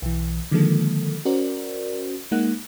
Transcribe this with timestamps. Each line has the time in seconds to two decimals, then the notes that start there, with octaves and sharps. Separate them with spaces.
0.02 B1 E3
0.51 D3 D#3 F3 G#3 A#3 A4
1.25 C#4 F#4 A#4 C5 D5
2.31 G#3 A#3 D#4 F#5 F#6